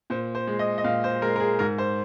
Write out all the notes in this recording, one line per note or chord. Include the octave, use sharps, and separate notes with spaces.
A#2 C5
C5
G#3
D#5
D#5
A#2 F5
C5
G#3 A#4
A#4
G#4
G#2 A#4
C5